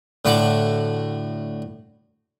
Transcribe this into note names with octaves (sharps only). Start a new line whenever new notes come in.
A2 D3 F#4 D6